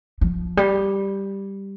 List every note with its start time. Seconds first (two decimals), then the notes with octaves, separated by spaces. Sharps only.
0.21 F3
0.57 G3